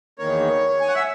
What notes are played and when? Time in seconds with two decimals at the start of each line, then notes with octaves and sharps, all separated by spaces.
0.19 E2 D#3 A#3 C#5
0.80 G#5
0.88 F#5
0.95 E5